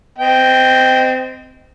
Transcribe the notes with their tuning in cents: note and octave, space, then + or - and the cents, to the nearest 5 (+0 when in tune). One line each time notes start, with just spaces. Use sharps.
C4 -25 D#5 +0 G5 +0